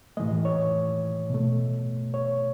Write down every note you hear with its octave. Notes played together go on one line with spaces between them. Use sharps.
A2 E3 A3 D#5
C#5
B2 A3
C#5